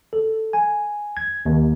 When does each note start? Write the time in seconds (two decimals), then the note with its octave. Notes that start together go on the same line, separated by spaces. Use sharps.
0.13 A4
0.53 G#5
1.17 G#6
1.46 D#2